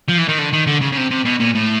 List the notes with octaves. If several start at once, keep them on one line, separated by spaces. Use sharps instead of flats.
F3
E3
D#3
D3
D#3
D3
C#3
C#3
C3
C3
B2
A#2
A2